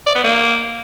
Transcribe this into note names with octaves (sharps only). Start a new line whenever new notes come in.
D5
B3
A#3